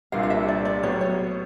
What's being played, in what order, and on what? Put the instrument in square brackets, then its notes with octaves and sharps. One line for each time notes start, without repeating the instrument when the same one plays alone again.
[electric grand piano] C2 A#2 G3 A#3 D4 [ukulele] F5
[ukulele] F5
E5
D5
D5
[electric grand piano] A2 F#3 B3 [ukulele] C#5
[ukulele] C#5